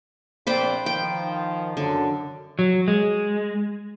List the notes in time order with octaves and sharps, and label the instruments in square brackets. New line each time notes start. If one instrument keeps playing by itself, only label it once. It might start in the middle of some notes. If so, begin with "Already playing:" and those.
[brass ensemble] A#1 C4 D5 [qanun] B4 C5 G5
[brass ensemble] D#3 F3 [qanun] G5
[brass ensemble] F#2 [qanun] D3
[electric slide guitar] F#3
G#3